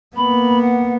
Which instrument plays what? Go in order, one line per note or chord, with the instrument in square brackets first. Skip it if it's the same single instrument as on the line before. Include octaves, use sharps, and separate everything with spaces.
[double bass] A#3 B3 [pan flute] B5
[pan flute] F#5